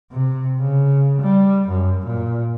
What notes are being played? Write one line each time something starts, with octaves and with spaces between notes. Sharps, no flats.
C3
C#3
G3
F#2
A#2